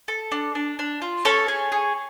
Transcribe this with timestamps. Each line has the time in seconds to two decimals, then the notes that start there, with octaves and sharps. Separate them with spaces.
0.08 A4
0.32 D4
0.55 D4
0.79 D4
1.02 F4
1.25 C#4 A4 C#5
1.48 G#4
1.72 G#4